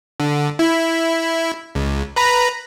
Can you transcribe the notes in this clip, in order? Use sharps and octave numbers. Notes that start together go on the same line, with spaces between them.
D3
E4
C#2
B4 A#5 B5